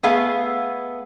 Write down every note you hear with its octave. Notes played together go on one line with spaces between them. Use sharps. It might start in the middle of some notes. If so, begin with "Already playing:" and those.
A3 B3 G#4 F5